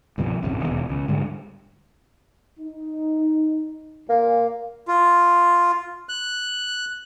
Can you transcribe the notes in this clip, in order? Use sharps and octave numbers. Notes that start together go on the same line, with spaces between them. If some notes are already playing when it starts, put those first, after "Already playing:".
C2 G2 B2 F3
A1 E2 G2 C3
D#1 E2 B2
C#2
G#2 D3 G3
D#4
A#2 A#3
F4
F#6